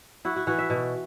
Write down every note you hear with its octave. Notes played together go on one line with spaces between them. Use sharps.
E4 F#4
F#4
E3 F#4
E5
B2